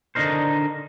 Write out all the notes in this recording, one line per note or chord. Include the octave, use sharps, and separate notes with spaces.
D3 D4 D#4 A#4 C5